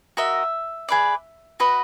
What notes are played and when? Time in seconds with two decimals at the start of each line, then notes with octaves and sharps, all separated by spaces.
0.17 F#4 A#4 D#5 E5
0.89 G#4 B4 D5
1.60 F#4 B4 D#5